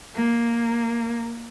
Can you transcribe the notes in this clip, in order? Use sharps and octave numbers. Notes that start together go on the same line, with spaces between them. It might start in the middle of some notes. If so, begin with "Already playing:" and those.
A#3